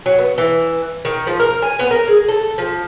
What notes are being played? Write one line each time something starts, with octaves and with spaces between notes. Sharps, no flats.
F#3
B3
E3
D#3
F3
A#4
G#5
B3
A#4
G#4
A4
F3